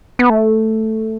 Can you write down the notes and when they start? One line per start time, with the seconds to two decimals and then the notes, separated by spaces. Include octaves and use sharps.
0.19 B3
0.30 A3